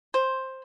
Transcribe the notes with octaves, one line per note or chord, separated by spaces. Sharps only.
C5